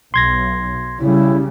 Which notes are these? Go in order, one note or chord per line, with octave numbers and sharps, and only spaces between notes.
B1 C6 G#6 A#6
C#3 G3 E4